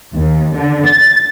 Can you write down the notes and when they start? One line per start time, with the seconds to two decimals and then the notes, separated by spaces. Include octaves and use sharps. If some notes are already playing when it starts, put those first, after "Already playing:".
0.15 D#2
0.55 D3
0.86 A6